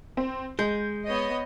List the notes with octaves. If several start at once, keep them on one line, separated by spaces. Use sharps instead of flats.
C4
G#3 G6
B3 C#5 D#5